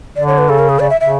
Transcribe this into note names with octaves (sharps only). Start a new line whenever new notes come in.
D3 D5
C#5
B4
C#3 A4
A#4
G#4
C#3 D5
E5
C#3 E5